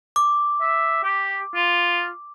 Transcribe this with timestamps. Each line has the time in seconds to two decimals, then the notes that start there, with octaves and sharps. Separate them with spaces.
0.16 D6
0.61 E5
1.04 G4
1.55 F4